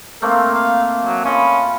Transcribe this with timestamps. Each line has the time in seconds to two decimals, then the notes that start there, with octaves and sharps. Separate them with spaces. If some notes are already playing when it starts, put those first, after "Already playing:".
0.22 A3 A#3 C4 A#4
0.54 F5
1.05 F#3
1.25 C#4 F4 D#5 B5